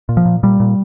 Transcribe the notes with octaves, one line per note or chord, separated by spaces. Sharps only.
A#2
F3
A#2
A#2 G3
A#2